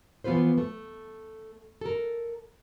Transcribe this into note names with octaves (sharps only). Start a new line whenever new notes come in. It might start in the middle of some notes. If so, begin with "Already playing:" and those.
E3 F3 B3 F4 B4 C5
A3
A4 A#4